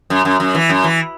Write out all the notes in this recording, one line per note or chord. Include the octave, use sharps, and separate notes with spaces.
F#2
F#2
F#2
E3
F#2
E3